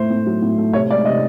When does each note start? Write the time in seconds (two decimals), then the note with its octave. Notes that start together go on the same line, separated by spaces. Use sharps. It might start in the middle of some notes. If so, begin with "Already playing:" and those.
Already playing: A2 A3 C5
0.10 A2
0.27 F#3
0.42 A2
0.58 A3
0.73 C3 C#5
0.90 G#3 D5
1.05 C3 D#5